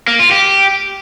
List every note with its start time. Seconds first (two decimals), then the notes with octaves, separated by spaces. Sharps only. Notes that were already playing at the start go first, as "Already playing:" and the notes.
0.08 A#3
0.19 F4
0.31 G4